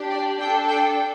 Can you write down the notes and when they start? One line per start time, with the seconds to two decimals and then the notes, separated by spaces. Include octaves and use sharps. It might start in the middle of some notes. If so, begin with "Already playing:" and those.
Already playing: D4 G4
0.09 D5
0.39 D4 A4 G5
0.68 G5